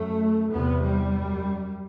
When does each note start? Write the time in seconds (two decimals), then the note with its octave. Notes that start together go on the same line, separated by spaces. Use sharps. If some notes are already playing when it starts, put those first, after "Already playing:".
Already playing: F#2 A3
0.52 E2 C3 B3
0.85 G3
1.17 F#2